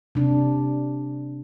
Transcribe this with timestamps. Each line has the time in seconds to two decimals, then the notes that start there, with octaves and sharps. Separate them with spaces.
0.15 C3 D4